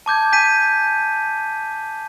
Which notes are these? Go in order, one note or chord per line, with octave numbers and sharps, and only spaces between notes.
A5 D6 G6 G#6
G#5 G6 B6 D#7